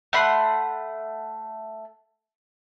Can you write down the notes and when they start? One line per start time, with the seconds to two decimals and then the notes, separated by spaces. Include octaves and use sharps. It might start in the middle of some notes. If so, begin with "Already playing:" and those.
0.13 A3 F#5 B5 C6